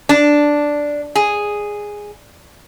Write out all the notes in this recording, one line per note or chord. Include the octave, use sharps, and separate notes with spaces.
D4
G#4